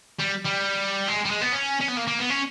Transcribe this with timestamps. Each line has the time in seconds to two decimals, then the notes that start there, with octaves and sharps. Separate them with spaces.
0.19 G3
0.45 G3
1.08 G#3
1.25 G3
1.30 G#3
1.42 B3
1.52 C#4
1.81 C#4
1.89 B3
1.97 A#3
2.08 A#3
2.19 B3
2.30 C#4